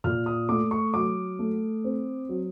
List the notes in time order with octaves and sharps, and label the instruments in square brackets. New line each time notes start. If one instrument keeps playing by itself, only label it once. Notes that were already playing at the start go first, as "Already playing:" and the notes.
[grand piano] A#2 F6
D#6
A3 D6
C#6
F#3 D6
A3
C4
F#3